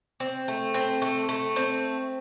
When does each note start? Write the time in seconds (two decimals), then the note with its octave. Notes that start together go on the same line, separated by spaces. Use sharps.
0.20 C4
0.48 A3
0.74 C4
1.02 A3
1.29 A3
1.56 C4